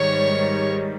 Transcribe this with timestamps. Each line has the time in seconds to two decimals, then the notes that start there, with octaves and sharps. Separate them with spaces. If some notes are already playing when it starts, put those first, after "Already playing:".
Already playing: G#2 D#3 G3 C#5